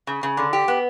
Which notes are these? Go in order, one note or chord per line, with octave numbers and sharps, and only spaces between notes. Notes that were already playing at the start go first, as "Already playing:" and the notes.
C#3
C#3
D3
G4
B3